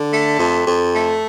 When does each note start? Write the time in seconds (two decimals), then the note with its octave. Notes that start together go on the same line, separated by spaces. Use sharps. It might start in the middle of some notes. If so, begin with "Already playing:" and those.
Already playing: D3
0.13 A3
0.39 F2
0.67 F2
0.94 A3